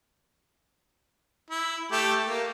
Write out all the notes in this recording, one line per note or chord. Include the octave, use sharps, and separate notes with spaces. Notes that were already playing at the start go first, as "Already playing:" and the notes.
E4
A3 G4
A#3